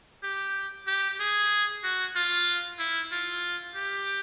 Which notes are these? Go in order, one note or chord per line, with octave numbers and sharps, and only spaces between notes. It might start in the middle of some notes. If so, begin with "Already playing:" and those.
G4
G4
G#4
F#4
F4
E4
F4
G4